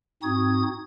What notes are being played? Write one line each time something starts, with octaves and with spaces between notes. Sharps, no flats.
G#2 C4 D#4 F#4 D#6 G#6